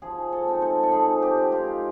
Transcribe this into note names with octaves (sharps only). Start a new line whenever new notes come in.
F3 G#4
A4
G#3 C4 D#4
A4
A4
F3 G#4
G4
G#3 C4 D#4
F4